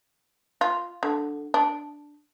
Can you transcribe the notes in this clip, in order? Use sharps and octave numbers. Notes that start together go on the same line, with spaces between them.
F4
D3
D4